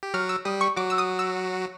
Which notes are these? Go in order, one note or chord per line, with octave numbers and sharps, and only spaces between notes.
G4
F#3 F#4 F6
E6
G3 G4 D#6
C#6
F#3 F#4 D6
E6
D#6
E6